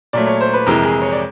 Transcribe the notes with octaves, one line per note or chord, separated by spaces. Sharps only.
A#2 F#3 A3 D5
C#5
C5
B4
F2 C3 E3 G#3 A#4
G#4
C#5
D5